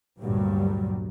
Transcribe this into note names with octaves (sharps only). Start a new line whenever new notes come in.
D2 G2 A#2 F#3 G3